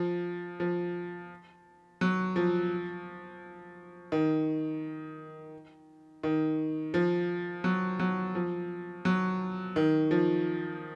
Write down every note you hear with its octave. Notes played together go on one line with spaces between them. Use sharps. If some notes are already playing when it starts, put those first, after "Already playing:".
Already playing: F3
F3
F#3
F3
D#3
D#3
F3
F#3
F#3
F3
F#3
D#3
F3